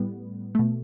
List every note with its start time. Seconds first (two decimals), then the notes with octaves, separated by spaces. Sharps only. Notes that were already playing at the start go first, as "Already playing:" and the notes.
Already playing: A2 G3 B3
0.55 B2 A3